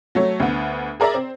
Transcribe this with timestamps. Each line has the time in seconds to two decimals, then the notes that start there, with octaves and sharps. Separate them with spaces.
0.15 F#3 A3 C#5
0.40 D2 B3
1.00 G#4 A#4 D5 E5 A#5
1.14 C4